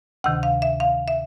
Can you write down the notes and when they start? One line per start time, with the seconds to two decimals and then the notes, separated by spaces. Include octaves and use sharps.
0.24 D2 C3 D#3 F#5
0.43 F5
0.62 E5
0.80 F5
1.08 E5